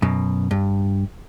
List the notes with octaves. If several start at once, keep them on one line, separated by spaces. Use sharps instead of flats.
F#2 B2
G2